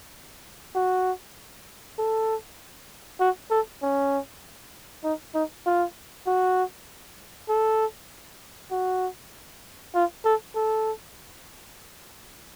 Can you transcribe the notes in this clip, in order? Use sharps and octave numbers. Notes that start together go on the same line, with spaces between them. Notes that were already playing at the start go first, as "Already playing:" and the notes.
F#4
A4
F#4
A4
C#4
D#4
D#4
F4
F#4
A4
F#4
F4
A4
A4